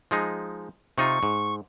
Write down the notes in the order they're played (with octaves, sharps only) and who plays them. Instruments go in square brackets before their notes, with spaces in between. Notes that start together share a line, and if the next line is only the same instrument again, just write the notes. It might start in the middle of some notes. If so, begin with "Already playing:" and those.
[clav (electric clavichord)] F3 G#3 D#4
[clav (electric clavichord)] C3 D#4 F4 [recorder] C#6
[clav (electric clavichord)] G#2